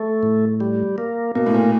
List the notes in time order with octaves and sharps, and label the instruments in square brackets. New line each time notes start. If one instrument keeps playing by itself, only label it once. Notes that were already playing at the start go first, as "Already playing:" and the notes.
Already playing: [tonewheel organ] A3
A2
G3
A#3
[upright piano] B2 [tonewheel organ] A#3
[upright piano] A2
A#2